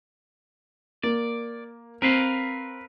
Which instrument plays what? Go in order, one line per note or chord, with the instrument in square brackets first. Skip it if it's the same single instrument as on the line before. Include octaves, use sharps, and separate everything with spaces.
[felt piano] A#3 [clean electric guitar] D5
[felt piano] C4 [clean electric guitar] A#4 B4 F5